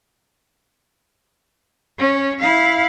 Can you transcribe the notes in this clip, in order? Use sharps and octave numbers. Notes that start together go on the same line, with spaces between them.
C#4
E4 F5